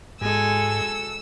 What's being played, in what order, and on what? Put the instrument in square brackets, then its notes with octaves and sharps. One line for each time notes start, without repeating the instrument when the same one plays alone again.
[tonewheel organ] G#2 [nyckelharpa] G#3 G#5 [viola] F#4 A4 [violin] E6